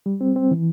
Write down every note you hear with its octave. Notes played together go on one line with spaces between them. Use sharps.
G3
C4
C4
E3